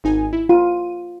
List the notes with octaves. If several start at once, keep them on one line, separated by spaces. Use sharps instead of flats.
G#1 D#4 G#5
E4
F4 D#7